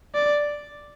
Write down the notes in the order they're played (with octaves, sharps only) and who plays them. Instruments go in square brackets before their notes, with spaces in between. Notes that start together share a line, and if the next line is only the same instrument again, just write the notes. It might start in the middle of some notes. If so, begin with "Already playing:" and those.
[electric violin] D5